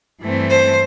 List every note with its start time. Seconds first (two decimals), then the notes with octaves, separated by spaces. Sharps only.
0.21 G2 E3 A3 C4
0.49 C5